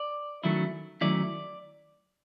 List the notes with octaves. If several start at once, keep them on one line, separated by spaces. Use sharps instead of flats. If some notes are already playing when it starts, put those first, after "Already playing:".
Already playing: D5
D#3 F#3 A3 C#4 E4
D#3 F#3 A3 C#4 E4 D5